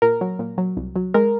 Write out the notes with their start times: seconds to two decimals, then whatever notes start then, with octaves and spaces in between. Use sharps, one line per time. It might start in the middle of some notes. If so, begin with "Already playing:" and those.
0.02 A#2 A#4
0.21 F#3
0.39 A#2
0.58 F#3
0.77 C2
0.96 F#3
1.14 G#3 A#4